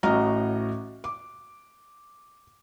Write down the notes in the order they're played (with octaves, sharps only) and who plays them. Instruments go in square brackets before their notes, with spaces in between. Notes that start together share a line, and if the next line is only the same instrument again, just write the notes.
[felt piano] A1 A2 F#4 D#5 A#5 F6
D6